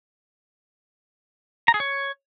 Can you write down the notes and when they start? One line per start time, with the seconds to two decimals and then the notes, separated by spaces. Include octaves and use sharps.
1.68 A#5
1.74 G#4
1.80 C#5